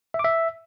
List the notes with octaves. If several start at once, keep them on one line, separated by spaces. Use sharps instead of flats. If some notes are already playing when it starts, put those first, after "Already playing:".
E5
D6
E5